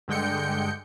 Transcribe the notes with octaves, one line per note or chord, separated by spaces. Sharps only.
G2 D3 G#3 G5 G6 C#7